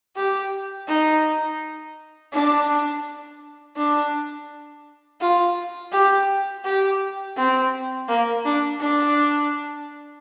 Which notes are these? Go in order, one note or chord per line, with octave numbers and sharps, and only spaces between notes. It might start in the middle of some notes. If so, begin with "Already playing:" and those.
G4
D#4
D4
D4
F4
G4
G4
C4
A#3
D4
D4